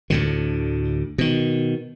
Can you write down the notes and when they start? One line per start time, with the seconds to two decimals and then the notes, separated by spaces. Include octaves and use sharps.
0.10 D2 A2 D3
1.18 B2 D#3